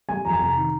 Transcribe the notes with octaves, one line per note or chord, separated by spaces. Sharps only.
G3 G#5
F2 A#5
G#5
C3 A#5
D#3